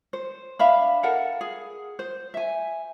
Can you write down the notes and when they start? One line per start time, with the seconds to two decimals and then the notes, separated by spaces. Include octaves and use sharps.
0.13 C5
0.59 D4 E5 F5 B5
1.03 A4 A#4 F5 F#5
1.41 G#4
1.99 C5
2.34 E5 G#5